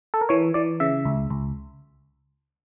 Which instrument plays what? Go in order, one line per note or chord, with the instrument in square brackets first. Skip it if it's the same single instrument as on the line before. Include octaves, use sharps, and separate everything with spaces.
[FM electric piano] A4
A#4
E3 C#5
E3 D5
C#3 E5
C#2
C#2